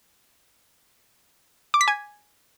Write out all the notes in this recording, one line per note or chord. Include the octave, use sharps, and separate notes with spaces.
D6
B6
G#5